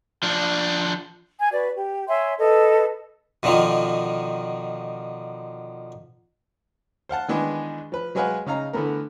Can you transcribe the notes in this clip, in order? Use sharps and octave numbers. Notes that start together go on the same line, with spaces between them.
F3 D4
G#5
F#4 B4 D5
G4
C#5 E5 G#5 C6
A4 B4 D#5
B2 D3 D#3 F3
C5 F5 F#5 A5
D#3 E3 G#3 B3 D4 G#4
F3 B4
F#3 G#3 G#4 B4 F5 F#5
C#3 D#4 F5 A#5
D3 E3 A3 B3 A#4